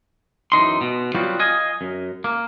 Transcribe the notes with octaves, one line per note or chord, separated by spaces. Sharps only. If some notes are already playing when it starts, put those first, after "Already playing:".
F#2 E3 D#4 C6
B2
F#3 G3 B3 C4 F4 F#4
D#5 F5 G#5
F#2
A#3